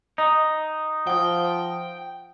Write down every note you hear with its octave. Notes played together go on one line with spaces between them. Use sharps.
D#4 D#5
F3 F#5 G5 D#6